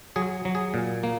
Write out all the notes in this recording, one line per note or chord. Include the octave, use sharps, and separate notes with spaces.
F#3 G#4
F#3
G#4
A#2
A#3